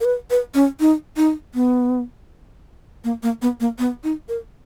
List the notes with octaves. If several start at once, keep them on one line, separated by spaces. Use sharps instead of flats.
A#4
B4
B4
C#4
D#4
D#4
B3
A#3
A#3
B3
A#3
B3
D#4
A#4